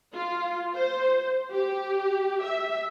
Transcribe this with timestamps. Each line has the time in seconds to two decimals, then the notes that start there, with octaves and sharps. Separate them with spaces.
0.14 F4
0.75 C5
1.53 G4
2.43 E5